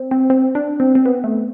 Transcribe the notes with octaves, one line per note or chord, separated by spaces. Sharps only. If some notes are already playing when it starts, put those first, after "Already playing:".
Already playing: C4
C4
C4
D4
C4
C4
B3
A3